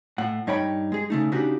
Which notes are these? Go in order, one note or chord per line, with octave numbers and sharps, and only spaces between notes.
A2 F#5
G2 D#4 C#5 G5 B5
G#3 G#4
C#3 A3 D#4
C#3 D4 D#4 F#4 G4 A#4